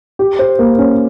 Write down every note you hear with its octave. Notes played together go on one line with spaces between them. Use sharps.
G4
C5
A#3
C#4